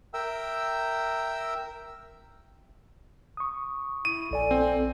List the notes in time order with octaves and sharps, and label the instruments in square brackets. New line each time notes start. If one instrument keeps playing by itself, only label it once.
[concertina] A#4 E5 G5 E6
[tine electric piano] C#6 D#6
[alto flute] E4 [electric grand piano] D#7
[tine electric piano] A#1 D5 G#5 [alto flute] A4
[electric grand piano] C4